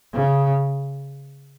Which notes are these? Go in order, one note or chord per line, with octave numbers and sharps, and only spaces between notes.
C#3